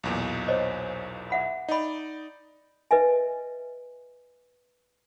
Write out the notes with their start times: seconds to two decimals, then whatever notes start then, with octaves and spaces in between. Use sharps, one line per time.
0.03 B1 E2 A#2
0.48 C5 C#5 D#5
1.30 E5 F#5 B5
1.69 D#4 D5 D#5 B5
2.91 B4 D#5 E5 G#5